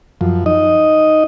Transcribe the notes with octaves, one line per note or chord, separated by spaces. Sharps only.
F#2 F3
D#4 D#5